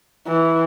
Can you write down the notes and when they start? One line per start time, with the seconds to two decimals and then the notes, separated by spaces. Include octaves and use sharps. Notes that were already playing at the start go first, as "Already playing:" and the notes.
0.27 E3